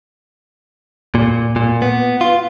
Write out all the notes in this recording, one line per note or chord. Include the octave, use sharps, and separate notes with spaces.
A#2
A#2
B3
F4